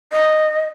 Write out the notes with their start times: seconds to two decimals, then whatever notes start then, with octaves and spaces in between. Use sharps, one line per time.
0.12 D#5